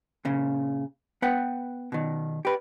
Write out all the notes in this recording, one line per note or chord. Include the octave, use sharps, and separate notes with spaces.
A#2 C#3
B3 B4 F#5 G5
B2 D#3
G4 B4